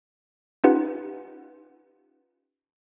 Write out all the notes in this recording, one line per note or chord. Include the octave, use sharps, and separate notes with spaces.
C#4 D#4 F4 G4 B4 F#5